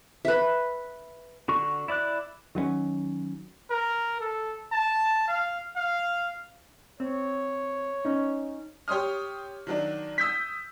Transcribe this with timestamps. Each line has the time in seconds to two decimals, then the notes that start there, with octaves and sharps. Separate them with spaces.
0.25 B4 E5
1.48 D3 F#4 C#6
1.88 E4 D5 D6 F#6
2.55 D#3 F#3 G#3 C#4
3.70 A#4
4.20 A4
4.72 A5
5.28 F5
5.76 F5
7.00 C4 C#5
8.05 C#4 D#4
8.88 G4 C#5 C6 D#6 F6
9.67 D#3 F#3 D4
10.18 D#6 E6 G6 B6